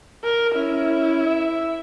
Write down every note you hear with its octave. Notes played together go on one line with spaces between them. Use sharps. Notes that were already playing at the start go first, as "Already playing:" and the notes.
A#4
C#4 E4
E5